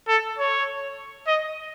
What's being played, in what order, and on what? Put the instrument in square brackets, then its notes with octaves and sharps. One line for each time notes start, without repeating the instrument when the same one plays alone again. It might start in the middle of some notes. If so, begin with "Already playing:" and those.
[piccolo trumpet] A4
C#5
D#5